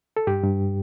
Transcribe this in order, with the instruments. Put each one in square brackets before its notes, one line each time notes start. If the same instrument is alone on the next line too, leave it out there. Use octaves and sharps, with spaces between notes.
[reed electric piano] A4
G2 G4
G2